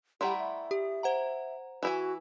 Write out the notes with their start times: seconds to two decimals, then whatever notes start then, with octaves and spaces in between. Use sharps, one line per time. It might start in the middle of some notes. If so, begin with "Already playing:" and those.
0.21 G3 A3 E4 G4 F#5 A#5 C6
0.39 E5
0.71 G4
1.03 C5 F#5 A#5
1.83 E3 E4 F#4 G#5